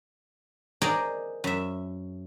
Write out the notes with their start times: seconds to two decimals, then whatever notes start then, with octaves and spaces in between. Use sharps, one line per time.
0.82 G#4 A#4 C5 D5 D#5 A#5
1.44 F#2 E5